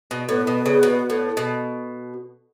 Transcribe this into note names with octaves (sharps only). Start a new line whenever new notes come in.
B2
A2 B3
B2
C#3
B2
A2
B2